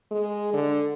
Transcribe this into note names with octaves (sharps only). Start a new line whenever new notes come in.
G#3
D3